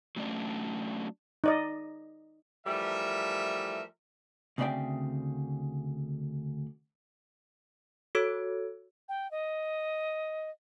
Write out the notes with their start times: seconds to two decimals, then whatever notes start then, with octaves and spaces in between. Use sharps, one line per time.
0.16 F#3 A3 C#4 D4 D5
1.44 D#4 D5 D#5
2.67 E3 F3 G3 A3 A#4 E5
4.58 D2 C#3 C4 D5 E5 G5
8.15 F#4 A4 C#5 E6 G#6 D7
9.09 G5
9.31 D#5